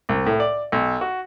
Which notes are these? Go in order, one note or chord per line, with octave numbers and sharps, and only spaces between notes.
C2
A2
D5
B1
F#4